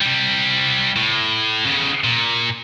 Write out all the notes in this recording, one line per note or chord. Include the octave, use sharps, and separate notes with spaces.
C3 G3
A2
C#3 B3
A#2